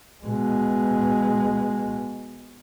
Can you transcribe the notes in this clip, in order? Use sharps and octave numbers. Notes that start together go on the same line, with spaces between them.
B2 G#3